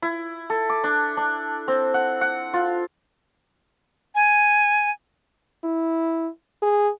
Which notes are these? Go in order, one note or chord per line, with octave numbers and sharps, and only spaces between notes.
E4
A4
D6
D4
D4
C4
F#5
F#5
F4
G#5
E4
G#4